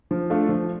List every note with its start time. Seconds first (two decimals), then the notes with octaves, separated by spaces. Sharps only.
0.11 F3
0.30 A3 D4 F4 A4
0.49 F3